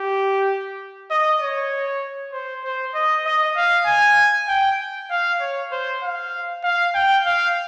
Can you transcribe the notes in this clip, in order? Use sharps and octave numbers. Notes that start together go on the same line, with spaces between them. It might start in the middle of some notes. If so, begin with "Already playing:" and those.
Already playing: G4
D#5
C#5
C5
C5
D#5
D#5
F5
G#5
G5
F5
C#5
C5
F5
F5
G5
F5